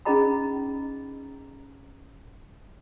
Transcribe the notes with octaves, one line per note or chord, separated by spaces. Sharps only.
C#4 D#4 G#4 D#5 A#5 B5